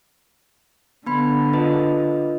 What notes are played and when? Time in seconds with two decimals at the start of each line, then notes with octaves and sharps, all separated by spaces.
1.06 D3 B3 B5
1.53 F4 B4 D#5